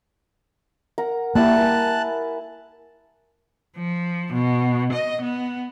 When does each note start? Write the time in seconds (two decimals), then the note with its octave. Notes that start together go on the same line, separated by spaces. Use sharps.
0.98 A#4 F#5 A#5
1.35 G3 A#3 E4 A#4 A5 F#6
1.56 A#4 G#5
3.77 F3
4.34 B2
4.93 D#5
5.22 B3